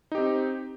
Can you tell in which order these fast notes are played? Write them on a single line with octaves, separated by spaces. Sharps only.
D#4 G4 C4